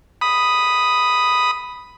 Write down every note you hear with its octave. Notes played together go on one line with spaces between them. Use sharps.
B5 D#6